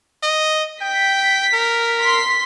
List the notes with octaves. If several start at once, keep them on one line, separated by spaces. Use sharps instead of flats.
D#5
G5 B6
A#4
C6 B6